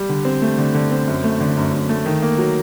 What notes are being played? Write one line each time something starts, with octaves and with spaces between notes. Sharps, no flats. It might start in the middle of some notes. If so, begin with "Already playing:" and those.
Already playing: G3
D3
C4
A3
D3
D3
C4
F#2
A3
D3
F#2
F#2
A3
D#3
A#3
F#3